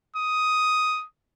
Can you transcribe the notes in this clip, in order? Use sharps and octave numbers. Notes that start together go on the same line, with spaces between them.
D#6